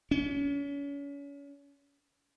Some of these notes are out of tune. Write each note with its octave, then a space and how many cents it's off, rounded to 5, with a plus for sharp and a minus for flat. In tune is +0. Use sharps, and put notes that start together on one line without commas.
C#4 +35